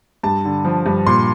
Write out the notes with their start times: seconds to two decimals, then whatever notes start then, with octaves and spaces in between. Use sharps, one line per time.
0.23 G2 A5
0.45 D3
0.65 F3
0.86 G2
1.07 A#2 C6